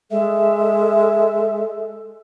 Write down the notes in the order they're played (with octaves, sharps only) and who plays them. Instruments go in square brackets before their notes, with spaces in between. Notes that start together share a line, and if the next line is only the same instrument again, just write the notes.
[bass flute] G#3 [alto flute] A4 [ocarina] E5